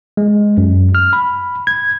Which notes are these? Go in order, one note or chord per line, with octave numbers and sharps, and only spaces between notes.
G#3
F#2
F6
B5
G#6